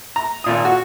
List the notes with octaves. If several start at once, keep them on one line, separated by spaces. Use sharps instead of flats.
A#5
G#1 A#2 D#6
F#4